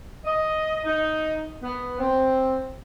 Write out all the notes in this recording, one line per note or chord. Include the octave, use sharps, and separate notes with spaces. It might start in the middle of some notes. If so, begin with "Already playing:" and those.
D#5
D#4
B3
C4